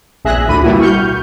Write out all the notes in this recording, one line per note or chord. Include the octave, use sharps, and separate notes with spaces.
A#1 G#4 E5 F#6 A#6
D2 A2 D4 B5 D#7
B2 G3 A#3 E4 F#4
C#6 F6 G6